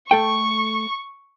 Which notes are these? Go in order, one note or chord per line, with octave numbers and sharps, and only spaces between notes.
A3 A4 G5 C#6